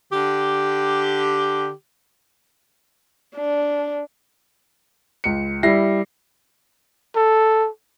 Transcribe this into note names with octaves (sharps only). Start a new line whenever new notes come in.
D3 G4
D4
C#2 C#7
G3 E4 A#6 C7
A4